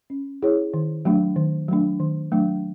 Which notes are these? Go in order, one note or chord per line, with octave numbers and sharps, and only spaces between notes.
C#4
E4 G#4 C#5
D#3
F#3 A3 D4
D#3
F#3 A3 D4
D#3
F#3 A3 D4